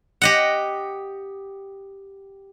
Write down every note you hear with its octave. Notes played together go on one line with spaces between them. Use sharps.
G4 D#5 F#5